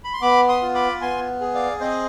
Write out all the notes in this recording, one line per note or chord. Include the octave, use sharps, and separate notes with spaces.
B5
C6
B3 B5 D6
C6 D#6
F4
B5 D6
B3 G#5 C6
G#4
D5 F5
C4 C5 D#5